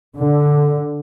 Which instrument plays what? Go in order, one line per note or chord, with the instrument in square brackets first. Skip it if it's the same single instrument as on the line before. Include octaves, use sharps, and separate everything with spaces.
[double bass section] D3